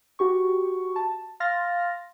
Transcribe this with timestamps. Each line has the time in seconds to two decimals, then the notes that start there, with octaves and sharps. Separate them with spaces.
0.19 F#4 G4 C#6
0.96 A5
1.40 F5 C6 F6 A6 A#6